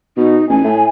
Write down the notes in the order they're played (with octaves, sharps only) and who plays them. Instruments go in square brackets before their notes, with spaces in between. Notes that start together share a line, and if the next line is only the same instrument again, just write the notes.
[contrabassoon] B2 [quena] D#4
[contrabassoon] A1 [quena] G#5
[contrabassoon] A2